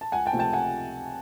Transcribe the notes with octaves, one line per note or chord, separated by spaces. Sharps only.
A5
C#2 F#5 G#5
G5 A5
C3 F3 A3 C4
G5 A5
F#5 G#5